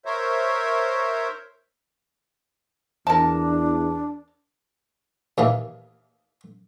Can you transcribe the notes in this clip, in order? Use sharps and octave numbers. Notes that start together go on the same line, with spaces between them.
A#4 C5 C#5 E5
E2 D4 A#4 A5
D#2 E3 A#3